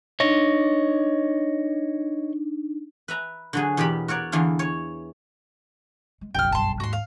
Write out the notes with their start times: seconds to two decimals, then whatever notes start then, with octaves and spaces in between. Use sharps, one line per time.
0.20 D4 D#4 C#5 D#5
3.08 B4 E5 A#5
3.53 D3 F#3 G#4
3.77 E2 B2 G4 A#4 A5 B5
4.08 F#4 A#4 C#5 D5
4.32 E2 D3 E3 F5
4.59 C#5
6.21 G#3
6.35 F#1 B1 F2 F3 G5 F6
6.52 G2 E3 A5 C6
6.80 D#2 G#2 F#4 C6
6.93 F5